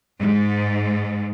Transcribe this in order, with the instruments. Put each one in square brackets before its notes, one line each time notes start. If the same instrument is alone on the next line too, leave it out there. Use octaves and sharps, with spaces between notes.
[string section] G#2